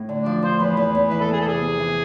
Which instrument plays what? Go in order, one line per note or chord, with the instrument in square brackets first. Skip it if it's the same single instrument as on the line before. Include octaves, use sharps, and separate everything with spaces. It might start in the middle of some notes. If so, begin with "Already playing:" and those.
Already playing: [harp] A2
D3
[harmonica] D4
[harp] F3
[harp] F3 [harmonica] C5
[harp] E2 [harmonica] B4
[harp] E2 [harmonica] B4
[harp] E2
[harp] E3 [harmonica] B4
[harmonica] A4
[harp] B3 [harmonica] G#4
[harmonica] A4
[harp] C3 [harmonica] G#4
[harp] B3
E3